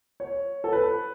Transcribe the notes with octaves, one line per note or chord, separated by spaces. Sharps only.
C#5
A4
B4